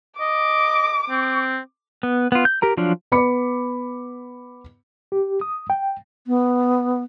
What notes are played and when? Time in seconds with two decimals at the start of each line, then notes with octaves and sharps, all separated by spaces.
0.20 D#5 D6
1.10 C4
2.03 B3
2.32 B3 F4
2.45 G6
2.62 G4 A#4 A#5
2.77 F3 F#3 D4 F4
3.12 B3 B4 B5 D6 C#7
5.12 G4
5.41 D#6
5.70 G5
6.27 B3